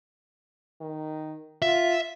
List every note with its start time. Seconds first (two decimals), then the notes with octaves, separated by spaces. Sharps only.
0.81 D#3
1.62 F4 E5